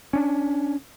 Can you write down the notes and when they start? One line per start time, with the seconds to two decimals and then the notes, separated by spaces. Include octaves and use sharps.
0.13 C#4 D4